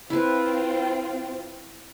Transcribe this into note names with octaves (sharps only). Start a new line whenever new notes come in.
C4 E4 F4 B4